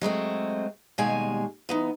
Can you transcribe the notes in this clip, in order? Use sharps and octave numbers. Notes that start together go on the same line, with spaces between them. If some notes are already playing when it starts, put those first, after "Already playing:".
F#3 G#3 A3 C4
D#2 B2 G3 G#3 G#5
E3 B3 D#4